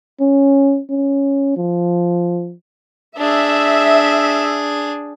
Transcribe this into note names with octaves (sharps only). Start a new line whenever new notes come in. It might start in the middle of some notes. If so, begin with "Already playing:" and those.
C#4
C#4
F3
D4 G#4 E5